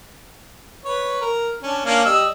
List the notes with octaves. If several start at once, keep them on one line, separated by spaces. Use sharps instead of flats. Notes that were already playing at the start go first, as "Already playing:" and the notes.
B4 C#5
A#4
C#4 D4
A#3 C#4 D4
G3 D#5 E6